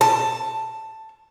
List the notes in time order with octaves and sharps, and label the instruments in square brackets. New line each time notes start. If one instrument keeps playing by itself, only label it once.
[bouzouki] A5